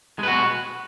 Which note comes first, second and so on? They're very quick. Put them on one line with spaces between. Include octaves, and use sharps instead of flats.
G#3 B4 F#4